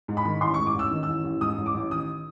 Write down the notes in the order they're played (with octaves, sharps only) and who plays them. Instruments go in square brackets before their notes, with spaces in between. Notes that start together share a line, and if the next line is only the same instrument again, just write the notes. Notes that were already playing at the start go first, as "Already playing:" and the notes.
[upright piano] G#2
B5
D#3
A1 C6
G#2 C#6
D6
A1 E6
D#3
E6
A1
A1
G#2 D#6
A1
D6
A1
D#3 D#6